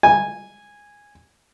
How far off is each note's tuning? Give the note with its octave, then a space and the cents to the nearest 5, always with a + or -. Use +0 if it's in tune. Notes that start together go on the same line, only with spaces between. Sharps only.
G#5 -10